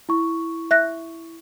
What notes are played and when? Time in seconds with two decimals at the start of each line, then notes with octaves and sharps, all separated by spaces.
0.09 E4 C#6
0.71 E5 F#6 A#6